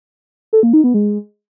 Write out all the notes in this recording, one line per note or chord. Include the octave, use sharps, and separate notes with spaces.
A4
A#3
D#4
B3
G#3